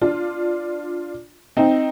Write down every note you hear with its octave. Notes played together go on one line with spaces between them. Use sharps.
D4 F4
C4 D#4